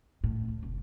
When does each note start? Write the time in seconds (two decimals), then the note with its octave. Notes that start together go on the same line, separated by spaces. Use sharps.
0.24 A2
0.48 C#2
0.63 F1 G3